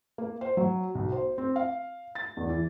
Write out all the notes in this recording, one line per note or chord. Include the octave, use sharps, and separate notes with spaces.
A#3
C5
F#3
B1
C5
C4
F5
A6
E2
E3